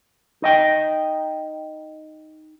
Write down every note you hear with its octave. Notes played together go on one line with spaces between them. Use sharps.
D#4 D#5 G5